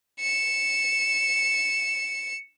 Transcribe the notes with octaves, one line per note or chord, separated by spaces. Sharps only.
C#7 E7